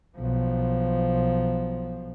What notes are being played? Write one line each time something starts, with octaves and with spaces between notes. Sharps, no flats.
B1 F3